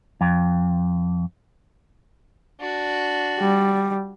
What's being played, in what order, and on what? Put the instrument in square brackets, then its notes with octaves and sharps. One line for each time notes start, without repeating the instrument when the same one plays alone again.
[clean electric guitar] F2
[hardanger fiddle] D4 F#4
[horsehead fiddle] G3